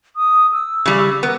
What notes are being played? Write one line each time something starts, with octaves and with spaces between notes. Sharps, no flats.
D#6
E6
C#3 G3
B3 A#4